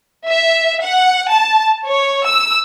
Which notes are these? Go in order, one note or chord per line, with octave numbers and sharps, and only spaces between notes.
E5
F#5
A5
C#5
E6